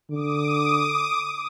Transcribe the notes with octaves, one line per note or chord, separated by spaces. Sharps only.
D3 D6 D#6